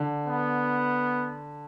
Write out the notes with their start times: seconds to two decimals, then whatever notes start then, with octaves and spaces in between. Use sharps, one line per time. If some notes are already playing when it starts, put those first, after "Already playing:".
Already playing: D3
0.27 B3